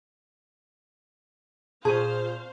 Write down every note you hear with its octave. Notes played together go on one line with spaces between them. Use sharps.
A#2 C4 G#4 C5 F5 A5 C#6